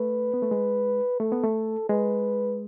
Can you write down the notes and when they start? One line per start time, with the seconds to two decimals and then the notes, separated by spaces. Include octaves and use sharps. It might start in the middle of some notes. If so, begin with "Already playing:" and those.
Already playing: A3 B4
0.34 B3
0.42 A3
0.51 G#3
1.20 A3 A4
1.32 B3
1.43 A3
1.89 G#3 B4